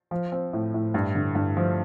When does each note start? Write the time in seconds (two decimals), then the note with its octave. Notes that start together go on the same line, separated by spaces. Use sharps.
0.11 F3
0.32 C4
0.53 A2
0.74 A2
0.94 G2
1.15 D3
1.35 G2
1.57 F3